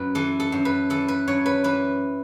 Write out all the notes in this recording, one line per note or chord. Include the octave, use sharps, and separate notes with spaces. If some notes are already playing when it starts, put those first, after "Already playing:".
Already playing: F#2 B4
E3 A4
A4
F#2
B4
E3 A4
B4
F#2 C#5
B4
E3 B4